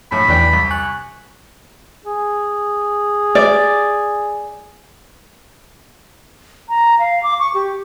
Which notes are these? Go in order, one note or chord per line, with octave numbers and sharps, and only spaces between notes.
A#1 A2 B5
E2 E3 D4 G5
C2
G#5 C#6 F#6
G#4
D5
A#5
F5
D6
C#6
G4